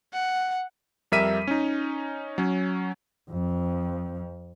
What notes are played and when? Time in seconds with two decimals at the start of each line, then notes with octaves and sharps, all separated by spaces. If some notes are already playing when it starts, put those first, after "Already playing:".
0.13 F#5
1.12 F2 G3 A#4 E5 B6 D#7
1.47 C#4 D#4
2.38 F#3 C#4
3.30 F2 F3